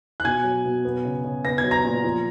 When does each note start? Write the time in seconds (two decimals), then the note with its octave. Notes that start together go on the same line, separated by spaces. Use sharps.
0.20 F#6
0.24 B2 G#5 G#6
0.44 F#3
0.65 B2
0.85 B3
1.05 C#3
1.24 C#3
1.45 B3 A#6
1.58 G#6
1.64 F#3
1.71 A#5 A#6
1.85 A#2
2.04 F3